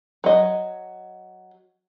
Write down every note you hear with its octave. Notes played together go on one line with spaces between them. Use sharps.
F#3 D#5